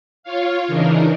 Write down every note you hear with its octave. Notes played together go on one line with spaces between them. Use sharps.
F4 C#5 F5
C#3 E3 D4 D#4 A#4